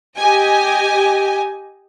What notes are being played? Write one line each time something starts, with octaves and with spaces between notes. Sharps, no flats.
G4 D#5 G#5